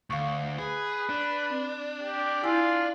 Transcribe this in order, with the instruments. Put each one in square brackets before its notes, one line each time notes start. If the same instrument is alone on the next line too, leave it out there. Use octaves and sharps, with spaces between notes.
[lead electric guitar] D2 [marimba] F5 C#6
[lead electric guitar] G#4 [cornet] B4
[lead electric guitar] D4
[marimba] C4
[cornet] G4
[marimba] E4 G#5 [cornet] F4